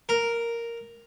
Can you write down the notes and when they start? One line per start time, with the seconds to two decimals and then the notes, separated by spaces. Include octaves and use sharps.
0.09 A#4